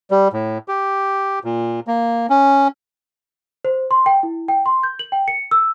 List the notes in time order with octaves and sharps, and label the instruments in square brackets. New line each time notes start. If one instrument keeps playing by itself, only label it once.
[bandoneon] G3
A2
G4
A#2
A#3
C#4
[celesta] C5
C6
G5
E4
G5
C6
G6
F#7
G5
C#7
E6